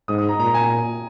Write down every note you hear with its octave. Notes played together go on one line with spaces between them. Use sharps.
G#2 D#6
D#6
A#5
A#2 A#5
G#5